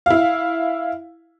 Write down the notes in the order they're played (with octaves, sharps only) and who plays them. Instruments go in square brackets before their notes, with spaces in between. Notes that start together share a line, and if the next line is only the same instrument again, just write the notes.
[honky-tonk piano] E4 F5